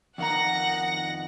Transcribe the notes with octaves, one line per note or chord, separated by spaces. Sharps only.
F2 D#3 F#5 A#5 A#6